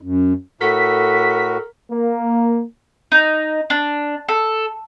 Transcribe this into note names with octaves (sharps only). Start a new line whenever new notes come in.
F#2
A2 F#4 A4 A#4 B6
A#3
D#4
D4
A4